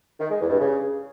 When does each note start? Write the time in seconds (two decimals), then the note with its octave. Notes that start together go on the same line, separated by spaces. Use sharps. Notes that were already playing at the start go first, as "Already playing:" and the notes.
0.20 D#3
0.30 G#3
0.40 E2
0.50 G2
0.60 C#3